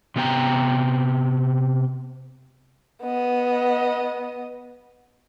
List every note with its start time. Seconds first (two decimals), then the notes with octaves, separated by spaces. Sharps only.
0.16 C3 B3 G5 A#5
3.02 B3 D#5